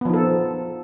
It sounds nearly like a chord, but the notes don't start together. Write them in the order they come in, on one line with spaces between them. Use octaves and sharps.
B3 F3 D#4 A4